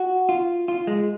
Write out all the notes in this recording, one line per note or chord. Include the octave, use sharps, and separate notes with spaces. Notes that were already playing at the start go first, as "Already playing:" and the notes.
Already playing: F#4
F4
F4
G#3